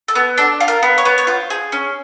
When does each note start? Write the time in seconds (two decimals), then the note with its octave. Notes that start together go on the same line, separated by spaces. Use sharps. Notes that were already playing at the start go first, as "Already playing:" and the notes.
0.08 A4
0.15 B3
0.38 D4 A4
0.60 F4
0.68 A#4
0.83 B3
0.98 C#5
1.05 B3
1.18 C#5
1.27 F4 C5
1.50 G#4
1.72 C#4